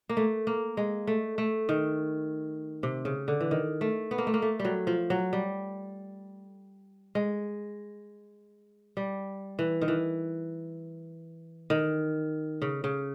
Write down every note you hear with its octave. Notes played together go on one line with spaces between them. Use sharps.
A#3
A3
A#3
G#3
A3
A3
D#3
C3
C#3
D3
E3
D#3
A3
B3
A#3
A3
A#3
A3
G3
F#3
F3
F#3
G3
G#3
G3
E3
D#3
E3
D#3
C#3
C#3